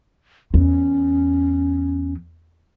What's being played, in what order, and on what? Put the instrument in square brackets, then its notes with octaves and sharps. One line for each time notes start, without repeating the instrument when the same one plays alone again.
[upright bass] E2 [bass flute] C#4